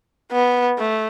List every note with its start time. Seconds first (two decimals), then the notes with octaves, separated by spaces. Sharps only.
0.32 B3
0.79 A3